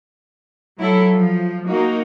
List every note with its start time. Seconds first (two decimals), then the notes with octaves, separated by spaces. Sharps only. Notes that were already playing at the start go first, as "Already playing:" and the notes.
0.78 F#3 E4 A4
1.13 F3
1.68 A#3 D#4 F#4